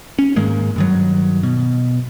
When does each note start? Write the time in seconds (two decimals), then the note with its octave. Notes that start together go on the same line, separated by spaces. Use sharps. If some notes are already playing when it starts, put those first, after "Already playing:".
0.19 C#4
0.36 G#2 D#3 G#3 A#3
0.76 G2 D#3 F#3
1.43 B2